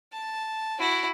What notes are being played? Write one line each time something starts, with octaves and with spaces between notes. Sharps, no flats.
A5
E4 F#4